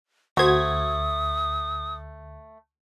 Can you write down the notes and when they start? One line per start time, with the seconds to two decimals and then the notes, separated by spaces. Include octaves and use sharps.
0.37 D2 A3 F#4 C5 D#6 G#6